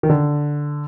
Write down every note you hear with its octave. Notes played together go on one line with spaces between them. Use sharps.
D#3
D3